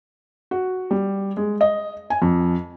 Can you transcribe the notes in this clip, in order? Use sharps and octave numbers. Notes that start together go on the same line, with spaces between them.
F#4
G3
G#3
D#5
G#5
F2